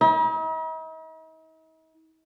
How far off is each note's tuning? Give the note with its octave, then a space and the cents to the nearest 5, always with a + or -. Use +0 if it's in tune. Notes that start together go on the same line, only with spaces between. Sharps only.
D#4 +45